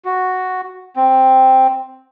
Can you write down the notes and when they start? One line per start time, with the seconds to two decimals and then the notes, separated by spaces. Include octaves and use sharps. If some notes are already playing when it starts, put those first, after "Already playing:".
0.05 F#4
0.96 C4